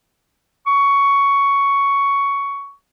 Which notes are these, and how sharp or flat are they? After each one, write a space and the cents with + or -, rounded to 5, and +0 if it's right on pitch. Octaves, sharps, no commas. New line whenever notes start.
C#6 +10